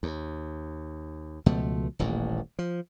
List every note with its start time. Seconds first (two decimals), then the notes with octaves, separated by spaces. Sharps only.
0.03 D#2
1.46 C#2 B2 F3 A3
1.99 D#1 A1 A#2
2.59 F3